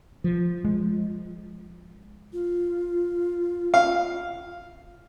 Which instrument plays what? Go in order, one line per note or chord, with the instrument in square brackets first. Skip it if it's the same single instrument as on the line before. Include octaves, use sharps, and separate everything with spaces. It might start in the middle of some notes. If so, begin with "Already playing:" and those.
[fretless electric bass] F3
[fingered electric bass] G#3
[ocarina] F4
[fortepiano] F5